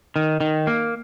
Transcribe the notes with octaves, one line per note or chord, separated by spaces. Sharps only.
D#3
D#3
A#3